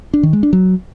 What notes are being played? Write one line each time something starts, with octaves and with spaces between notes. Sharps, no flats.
D4
D#3
G#3
D4
F#3